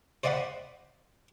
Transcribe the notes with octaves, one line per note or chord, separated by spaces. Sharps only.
C5 D5 D#5 F5 F#5 B5